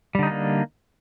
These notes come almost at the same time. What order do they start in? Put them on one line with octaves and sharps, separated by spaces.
G3 D3 D#4 D4 A#3